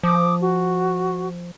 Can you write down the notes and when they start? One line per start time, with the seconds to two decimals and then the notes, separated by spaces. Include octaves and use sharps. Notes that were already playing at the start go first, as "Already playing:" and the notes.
0.03 F3 D6 D#6
0.40 F#4